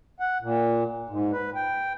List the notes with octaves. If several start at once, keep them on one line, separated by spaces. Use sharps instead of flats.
F#5
A#2
G#2
B4
G5